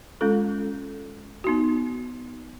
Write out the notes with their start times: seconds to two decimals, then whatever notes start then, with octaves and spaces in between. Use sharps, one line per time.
0.21 G#3 C#4 F4 A4
1.44 B3 D#4 F#4